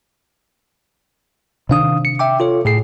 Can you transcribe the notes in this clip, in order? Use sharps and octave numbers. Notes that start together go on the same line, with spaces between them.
C3 D#3 D4 F5 D#6
C#7
E5 G5 D6
F4 A4 C#5
A2 G#4 C7